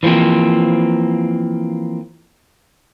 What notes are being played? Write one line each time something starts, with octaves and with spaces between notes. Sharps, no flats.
E3 F3 G3 A#3 C4